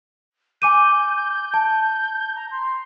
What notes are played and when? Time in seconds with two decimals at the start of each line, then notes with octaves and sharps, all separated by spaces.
0.62 G#5 D6 G6 D#7
1.54 A5
2.35 A#5
2.51 C6